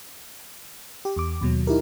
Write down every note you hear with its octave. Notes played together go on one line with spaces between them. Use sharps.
G4
E2 D6
D#2 B2 F#3
D#4 E4 G4 A#4